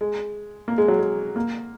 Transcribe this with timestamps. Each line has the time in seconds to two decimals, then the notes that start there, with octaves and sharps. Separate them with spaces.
0.01 G#3
0.68 A#3
0.78 G#3
0.88 F#3
0.99 G#3
1.36 A#3